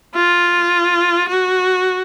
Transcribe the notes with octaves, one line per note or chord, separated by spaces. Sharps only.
F4
F#4